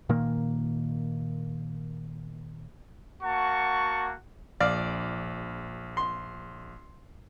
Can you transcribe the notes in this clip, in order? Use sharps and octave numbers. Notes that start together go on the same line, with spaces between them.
A#2 D#3 A#3
A#3 F#4 F#5 A5 C#6
A#1 D5 F5
C6